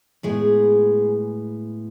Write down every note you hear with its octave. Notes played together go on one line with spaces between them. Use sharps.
A2 G#3 B3 G#4